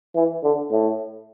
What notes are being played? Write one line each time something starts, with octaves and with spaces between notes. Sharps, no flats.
E3
D3
A2